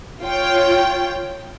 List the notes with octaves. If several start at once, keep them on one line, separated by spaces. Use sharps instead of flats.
F4 C#5 G5